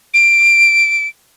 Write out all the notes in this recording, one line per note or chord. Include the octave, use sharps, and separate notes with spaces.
D7